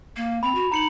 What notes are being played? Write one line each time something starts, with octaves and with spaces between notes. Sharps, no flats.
A#3
C4 B5 F7
F#4
D#4 A#5 C#7 F#7